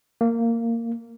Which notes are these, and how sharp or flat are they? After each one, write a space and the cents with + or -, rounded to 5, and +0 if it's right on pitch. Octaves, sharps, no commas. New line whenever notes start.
A#3 -15